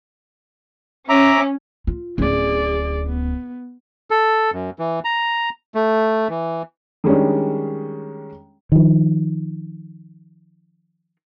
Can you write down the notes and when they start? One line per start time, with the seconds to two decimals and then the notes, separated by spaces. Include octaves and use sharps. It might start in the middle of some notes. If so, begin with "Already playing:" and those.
1.09 C#4 E5 A#5 D6
1.87 F4
2.18 D1 C#4 G#4 D5
3.06 B3
4.11 A4
4.53 F#2
4.79 E3
5.05 A#5
5.75 A3
6.29 E3
7.04 D#3 G3 G#3 C#4 D4
8.72 D#3 F3